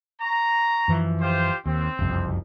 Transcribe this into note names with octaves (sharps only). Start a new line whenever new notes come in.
A#5 C#6
F#2 E3 F3
F4 G4 C5
D#2 C4
F#1 C2 F2